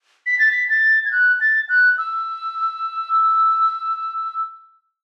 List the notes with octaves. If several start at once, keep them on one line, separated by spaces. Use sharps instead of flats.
B6
A6
B6
A6
G#6
F#6
A6
F#6
E6